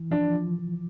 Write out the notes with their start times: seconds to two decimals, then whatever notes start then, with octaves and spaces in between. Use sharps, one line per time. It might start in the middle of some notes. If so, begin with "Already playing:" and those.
Already playing: E3
0.11 F3 D4
0.34 F3
0.59 F3